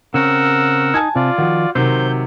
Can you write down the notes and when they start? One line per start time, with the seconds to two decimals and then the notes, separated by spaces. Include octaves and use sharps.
0.14 C#3 C4 C#4 A#4 F#5 E6
0.94 D#4 G#5 A5 G#6
1.16 C3 F4 D5
1.38 D#3 F3 F#4
1.75 C3 D#3 F#3 C5 G6